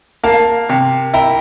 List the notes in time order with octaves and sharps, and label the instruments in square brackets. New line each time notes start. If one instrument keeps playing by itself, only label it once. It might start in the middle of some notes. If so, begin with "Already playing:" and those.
[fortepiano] A#3 [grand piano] F5 A5
[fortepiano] C3
[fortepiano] E4 [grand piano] G5 A#5